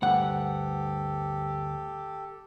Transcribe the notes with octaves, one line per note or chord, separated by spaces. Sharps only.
D2 G2 G4 A4 F#5